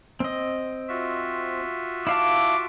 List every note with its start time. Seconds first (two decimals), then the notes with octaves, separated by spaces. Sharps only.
0.20 C4 D#5
0.89 F4 F#4 E5
2.07 E4 F5 A5 D6